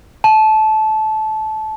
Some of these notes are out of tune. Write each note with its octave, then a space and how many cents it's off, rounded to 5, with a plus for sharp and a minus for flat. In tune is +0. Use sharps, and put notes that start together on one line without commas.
A5 -20